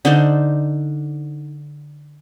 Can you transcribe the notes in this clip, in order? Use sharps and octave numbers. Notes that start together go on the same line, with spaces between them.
D3 D4 D#4 C5